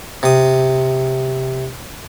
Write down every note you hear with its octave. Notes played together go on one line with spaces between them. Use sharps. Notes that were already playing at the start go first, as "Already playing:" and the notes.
C3 D#6